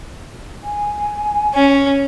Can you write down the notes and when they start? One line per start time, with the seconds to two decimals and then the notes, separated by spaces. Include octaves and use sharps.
0.63 G#5
1.54 C#4